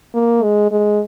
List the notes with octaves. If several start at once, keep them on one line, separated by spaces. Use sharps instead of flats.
A#3
G#3
G#3